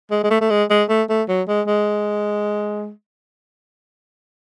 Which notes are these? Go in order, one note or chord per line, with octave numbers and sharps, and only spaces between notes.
G#3
G#3
A3
A3
G#3
G#3
A3
A3
F#3
G#3
G#3